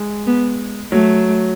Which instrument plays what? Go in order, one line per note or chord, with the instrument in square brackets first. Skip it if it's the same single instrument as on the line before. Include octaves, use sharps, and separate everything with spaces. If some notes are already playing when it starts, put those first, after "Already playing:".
Already playing: [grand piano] G#3
[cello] B3
[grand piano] F#3 [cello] A3